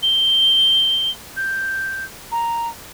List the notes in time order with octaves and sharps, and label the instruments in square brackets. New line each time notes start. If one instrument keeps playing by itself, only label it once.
[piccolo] G7
G6
A#5